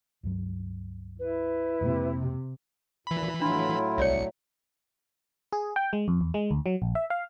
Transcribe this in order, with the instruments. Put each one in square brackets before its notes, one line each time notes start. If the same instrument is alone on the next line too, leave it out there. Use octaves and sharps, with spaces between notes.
[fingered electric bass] C#2 G2 F#3
[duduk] E4 [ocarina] B4
[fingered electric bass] F2 G#3 A#3 [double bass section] C3
[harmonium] D2 A#2 [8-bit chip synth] E3 B5
[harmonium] A2 F#3 A3 [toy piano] D4 [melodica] E4 F4
[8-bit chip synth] C2 C#7 [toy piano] C#5 D5 E5
[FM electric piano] G#4
G5
G#3
F2
E2
G#3
D2
F#3
A#1
E5
F5